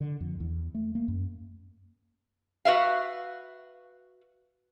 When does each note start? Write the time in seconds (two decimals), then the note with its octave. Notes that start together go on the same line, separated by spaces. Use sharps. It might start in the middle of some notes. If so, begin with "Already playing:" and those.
0.01 D3
0.20 F2
0.40 E2
0.75 A3
0.95 A#3
1.08 F#2
2.65 F#4 B4 E5 F5